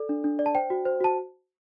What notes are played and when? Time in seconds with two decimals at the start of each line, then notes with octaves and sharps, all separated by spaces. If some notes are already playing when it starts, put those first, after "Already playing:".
Already playing: A4 D5
0.09 D4
0.24 D4
0.39 D5
0.46 A5
0.55 C5 G5
0.70 F#4
0.85 C5
1.01 F#4 A5